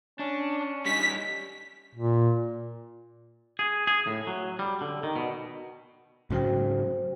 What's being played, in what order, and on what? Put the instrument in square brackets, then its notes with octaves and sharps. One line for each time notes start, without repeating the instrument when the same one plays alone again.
[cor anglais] C#4 [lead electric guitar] D4
[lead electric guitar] G3 D#4 [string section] B6
[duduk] A#2
[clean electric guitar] G#4
G#4
A2
F#3
G3
D3
D#3
B2
[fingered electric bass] G#2 C#3 F#3 [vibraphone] F#4 C5 G5